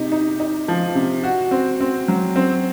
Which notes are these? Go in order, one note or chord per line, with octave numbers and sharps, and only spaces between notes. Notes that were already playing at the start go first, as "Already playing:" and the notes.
Already playing: C3 D#4
D#4
D#4
F3
C3
F#4
C4
C4
F#3
C4